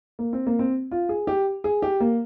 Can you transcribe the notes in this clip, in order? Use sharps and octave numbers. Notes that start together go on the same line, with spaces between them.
A#3
C4
A#3
C4
F4
G#4
G4
G#4
G4
A#3